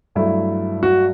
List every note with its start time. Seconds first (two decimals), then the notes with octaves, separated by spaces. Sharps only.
0.15 G2 F#3 A3 E4
0.83 F#4